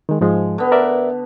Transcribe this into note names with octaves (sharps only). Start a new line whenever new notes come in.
D#3 G#3
G#2 F3 G#3
D3 B3
A#4 D5 E5